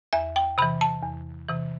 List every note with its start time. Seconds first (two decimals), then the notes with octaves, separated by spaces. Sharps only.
0.13 E2 E5
0.36 G5
0.58 C3 E3 B5
0.81 A5
1.03 E2
1.48 C3 E3